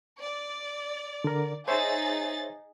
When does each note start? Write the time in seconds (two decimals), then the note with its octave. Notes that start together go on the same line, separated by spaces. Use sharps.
0.21 D5
1.24 D3 A#4
1.68 D#4 G#4 C5 C#5 E5 A6